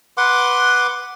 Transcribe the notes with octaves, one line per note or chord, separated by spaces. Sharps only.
B4 F#5 C6 D6